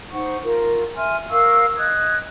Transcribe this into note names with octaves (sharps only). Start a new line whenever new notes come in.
D#4 C5 F#5 C#6
F4 A#4
E5 G#5 C6 F6
A#4 F5 C#6 E6
D#5 D#6 F#6 G#6